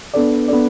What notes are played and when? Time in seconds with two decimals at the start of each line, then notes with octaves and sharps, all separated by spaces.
0.14 B3 D4 A4 D5
0.48 B3 D4 A4 D5